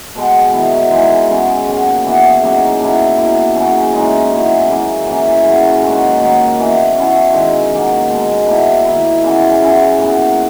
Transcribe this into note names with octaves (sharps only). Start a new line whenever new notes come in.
B2 G#3 B3
D#3 F#3 B3 E4
E3 G#3 D#4
C#3 G#3 B3 F#4
A#2 F#3 B3
E3 B3 F#4
C#3 F#3 A#3 D#4
B2 A#3 E4
B2 A#3 E4
C#3 F#3 C#4
E3 G#3 D#4
C#3 F#3 B3 E4
C#3 F#3 A#3 E4
E3 A#3 C#4
C#3 F#3 C#4
A#2 G#3 D#4 F#4
D#3 A#3 D#4 F#4
E3 B3 F#4
F#3 C#4 E4
D#3 G#3 D#4
A#2 F#3 A#3
B2 G#3 D#4
B2 A#3 E4
D#3 A#3 E4
C#3 E3 B3 E4
F#3 C#4 E4
A#2 F#3 B3